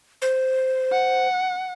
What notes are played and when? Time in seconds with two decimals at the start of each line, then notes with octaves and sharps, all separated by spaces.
0.22 C5
0.92 F#5